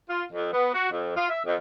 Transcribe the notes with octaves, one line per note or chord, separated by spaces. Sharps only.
F4
F2
B3
F#4
F2
F4
E5
F2